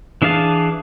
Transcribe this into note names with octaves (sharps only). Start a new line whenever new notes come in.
E3 D4 G#4 F5 A5